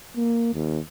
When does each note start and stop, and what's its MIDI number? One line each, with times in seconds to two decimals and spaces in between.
0.16 0.53 58
0.54 0.78 39